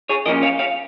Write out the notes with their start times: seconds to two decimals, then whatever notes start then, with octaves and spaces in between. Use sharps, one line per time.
0.09 G#4 C#5
0.26 A#2 F3 A#3 C#4 A#4 D#5
0.43 C#5 F5
0.59 C#5 F5